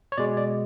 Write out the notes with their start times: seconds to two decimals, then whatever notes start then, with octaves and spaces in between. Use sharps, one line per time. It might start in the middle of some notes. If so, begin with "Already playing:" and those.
0.12 C#5
0.18 B2 G#3 D5
0.37 D5